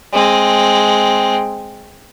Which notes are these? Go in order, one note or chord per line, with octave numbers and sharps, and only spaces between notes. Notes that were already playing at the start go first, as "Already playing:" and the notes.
G#3 C4